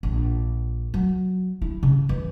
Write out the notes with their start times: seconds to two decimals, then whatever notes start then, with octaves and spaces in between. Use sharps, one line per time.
0.03 A#1
0.94 F#3
1.62 E4
1.83 C#3
2.09 E3